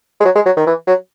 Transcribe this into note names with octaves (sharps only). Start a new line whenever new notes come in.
G#3
F#3
G#3
F#3
D#3
E3
F#3